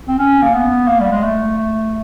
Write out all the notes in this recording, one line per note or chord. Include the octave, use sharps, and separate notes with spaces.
C4
C#4
A#3
B3
A#3
G3
G#3
A3
A3